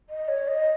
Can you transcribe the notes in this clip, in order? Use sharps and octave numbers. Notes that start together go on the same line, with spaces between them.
D#5
C#5
D#5